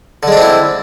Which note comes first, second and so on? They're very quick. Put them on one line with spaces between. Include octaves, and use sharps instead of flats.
D3 G#3 D4 C4 E4